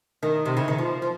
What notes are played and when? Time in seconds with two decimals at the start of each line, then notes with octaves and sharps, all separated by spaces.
0.23 D#3
0.45 C3
0.57 C#3
0.68 D#3
0.78 F3
1.02 F3